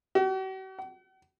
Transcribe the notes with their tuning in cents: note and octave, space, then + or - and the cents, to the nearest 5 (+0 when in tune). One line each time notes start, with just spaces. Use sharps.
F#4 +45
F#5 +45